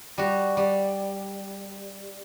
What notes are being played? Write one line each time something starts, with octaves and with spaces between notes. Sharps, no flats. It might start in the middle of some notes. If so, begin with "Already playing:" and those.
G3 F#4
G3